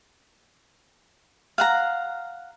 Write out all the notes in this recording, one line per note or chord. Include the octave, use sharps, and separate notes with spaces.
F5 F#5 A#5